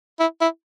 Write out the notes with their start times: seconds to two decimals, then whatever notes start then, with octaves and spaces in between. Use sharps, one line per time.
0.19 E4
0.41 E4